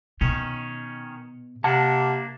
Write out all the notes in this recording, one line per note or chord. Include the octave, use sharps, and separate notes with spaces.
B2 D#3 C#4
C3 A#3 D4 F#5 A5